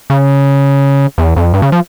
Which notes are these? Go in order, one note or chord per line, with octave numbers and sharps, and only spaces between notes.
C#3
E2
F2
G2
C#3
F3